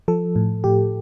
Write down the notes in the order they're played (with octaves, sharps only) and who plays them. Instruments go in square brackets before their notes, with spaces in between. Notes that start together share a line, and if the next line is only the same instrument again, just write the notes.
[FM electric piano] F3 A4
A2
A2 G4